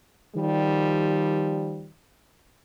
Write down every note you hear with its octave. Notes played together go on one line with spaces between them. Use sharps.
D#3 F3 G3